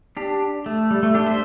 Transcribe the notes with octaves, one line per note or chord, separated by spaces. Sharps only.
D4 G4
A3
G3
A3
D4 G4
C5 E5